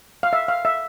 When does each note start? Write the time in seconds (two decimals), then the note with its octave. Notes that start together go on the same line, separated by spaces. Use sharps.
0.23 F5
0.33 E5
0.48 F5
0.65 E5